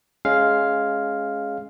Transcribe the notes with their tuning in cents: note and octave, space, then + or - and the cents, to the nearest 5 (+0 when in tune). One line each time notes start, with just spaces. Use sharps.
G#3 +10 C#4 -5 F5 +0